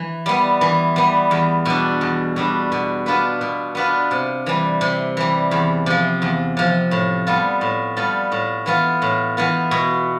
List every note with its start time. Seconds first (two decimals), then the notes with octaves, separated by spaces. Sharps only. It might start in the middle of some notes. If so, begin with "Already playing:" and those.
Already playing: E3
0.26 G3 B3
0.61 E3
0.96 G3 B3
1.31 E2
1.65 B2 G3 D4
2.01 E2
2.36 B2 G3 D4
2.72 B2
3.06 B3 D4 F4 B4
3.41 B2
3.75 B3 D4 F4 B4
4.11 C3
4.46 E3 G3
4.81 C3
5.17 E3 G3
5.51 E2
5.86 C3 F3
6.22 E2
6.57 C3 F3
6.91 A2
7.27 G3 B3 F4 A4
7.61 A2
7.97 G3 B3 F4 A4
8.32 A2
8.66 E3 B3 F4
9.02 A2
9.37 E3 B3 F4
9.71 B2